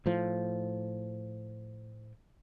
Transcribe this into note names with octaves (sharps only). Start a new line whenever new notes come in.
A2 F3